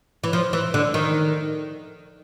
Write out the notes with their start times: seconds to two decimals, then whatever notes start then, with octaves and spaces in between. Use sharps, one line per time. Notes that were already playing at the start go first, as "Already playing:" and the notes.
0.24 E3
0.33 F3
0.53 E3
0.74 D3
0.94 D#3